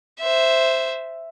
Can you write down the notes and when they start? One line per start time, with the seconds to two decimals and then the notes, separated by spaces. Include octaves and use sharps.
0.20 C5 E5